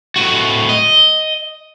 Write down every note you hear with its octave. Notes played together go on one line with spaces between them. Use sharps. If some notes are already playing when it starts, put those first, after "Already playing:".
A2 F#4
D#5